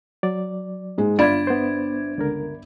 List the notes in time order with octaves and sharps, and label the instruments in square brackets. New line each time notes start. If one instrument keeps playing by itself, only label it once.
[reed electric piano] F#3 D5
[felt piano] G#2 G#3
[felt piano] G1 D5 B5 [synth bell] D4 G#6 [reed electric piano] F4
[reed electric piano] B3 C5
C#2 D3 A#4